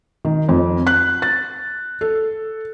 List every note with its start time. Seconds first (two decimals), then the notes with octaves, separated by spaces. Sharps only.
0.25 D#3
0.49 F2
0.87 F#6
1.22 A6
2.01 A4